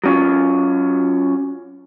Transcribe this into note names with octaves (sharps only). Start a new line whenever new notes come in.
F#3 C#4 F4